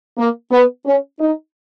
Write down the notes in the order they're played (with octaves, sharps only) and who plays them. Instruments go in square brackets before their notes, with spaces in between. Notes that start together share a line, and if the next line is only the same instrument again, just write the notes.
[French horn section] A#3
B3
C#4
D#4